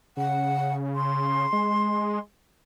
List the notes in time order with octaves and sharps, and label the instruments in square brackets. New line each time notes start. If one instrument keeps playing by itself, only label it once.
[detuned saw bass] C#3 [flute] F#5
[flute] C6
[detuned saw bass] G#3